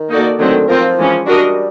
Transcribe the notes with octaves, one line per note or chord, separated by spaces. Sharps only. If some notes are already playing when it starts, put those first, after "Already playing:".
Already playing: D#3
A#3 D#4 F#4 A4 D5
D3 D#3 F#3 A3 C4
F3 C4 F4 A#4
E3 G#3 C#4
G3 D4 F#4 A#4 D#5